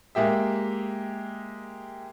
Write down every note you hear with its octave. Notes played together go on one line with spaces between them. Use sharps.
G#3 A#3 G4 E5